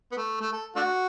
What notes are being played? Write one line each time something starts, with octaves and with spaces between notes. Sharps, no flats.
B3
A3
A3
A4
A3 D4 F#4